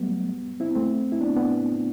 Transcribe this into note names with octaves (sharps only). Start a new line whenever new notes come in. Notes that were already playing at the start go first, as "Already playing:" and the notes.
Already playing: F#3 G3 A3 B3
C4 E4
A3 C4
E4
B3 D4
B3 D4